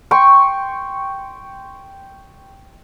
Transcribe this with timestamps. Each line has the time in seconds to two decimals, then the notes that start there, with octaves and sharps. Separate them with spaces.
0.11 G5 C6 C#6